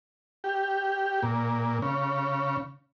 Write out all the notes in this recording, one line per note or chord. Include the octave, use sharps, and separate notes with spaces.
G4
A#2
C#3